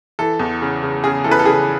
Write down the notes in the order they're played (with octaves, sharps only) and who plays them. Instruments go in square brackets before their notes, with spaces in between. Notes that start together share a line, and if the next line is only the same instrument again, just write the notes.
[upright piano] E3 A4
E2
C#3
C#3
C#3 G#4
E3 A4
B4
A4
C#3 G#4